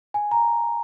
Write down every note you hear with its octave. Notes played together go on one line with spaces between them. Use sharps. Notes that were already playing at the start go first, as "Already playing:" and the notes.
G#5
A#5